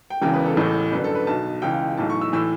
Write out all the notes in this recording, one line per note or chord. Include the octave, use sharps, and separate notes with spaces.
G5
E1 E2 C#3 E3 G5
B4
A4
A1 A2 E3
G1 F#2 D3 B4
A4
B4
B1 B2 A5
C#2 C#3 E3 G5
G5
B1 A2 E3 A5
C#6
E6
A2 E3 E6